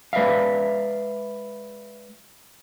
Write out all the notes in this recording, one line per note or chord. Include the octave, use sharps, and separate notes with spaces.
G#3 B4 D5 E5 F5